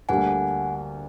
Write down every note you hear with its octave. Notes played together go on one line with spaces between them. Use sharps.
D2 D3 G3 A#3 D4 F#5 G#5